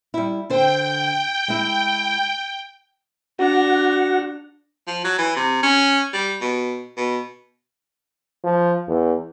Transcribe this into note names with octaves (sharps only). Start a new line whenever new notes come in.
G3 E4
D3 A4 C5 G5
G#3 E4
D4 F#4 F#5 A#5
F3
F#3
E3
C3
C#4
G3
B2
B2
F3
E2